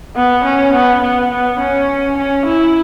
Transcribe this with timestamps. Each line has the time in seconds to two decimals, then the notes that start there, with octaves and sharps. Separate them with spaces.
0.16 B3
0.44 C#4
0.73 B3
1.02 B3
1.31 B3
1.59 C#4
2.18 C#4
2.46 E4